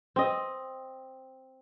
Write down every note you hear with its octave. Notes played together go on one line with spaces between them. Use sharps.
C4 D#5